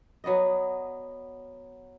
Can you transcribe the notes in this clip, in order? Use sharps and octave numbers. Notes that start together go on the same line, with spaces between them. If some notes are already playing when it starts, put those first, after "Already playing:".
F#3 B3 D5 D#5